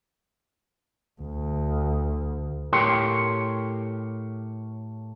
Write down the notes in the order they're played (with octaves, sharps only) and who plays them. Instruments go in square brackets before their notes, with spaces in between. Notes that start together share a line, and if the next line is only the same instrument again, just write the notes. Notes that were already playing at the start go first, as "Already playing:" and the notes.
[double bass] D2
[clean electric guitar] A2 G4 A#4 C#5 G5 C6